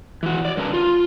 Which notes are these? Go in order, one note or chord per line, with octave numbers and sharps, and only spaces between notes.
E3 F#4
C#5 D5
G2 C#3 A#4 B4 A5
F4